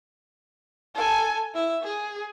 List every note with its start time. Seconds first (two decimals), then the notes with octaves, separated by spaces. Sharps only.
0.95 A4 G#5
1.55 E4 E5
1.83 G#4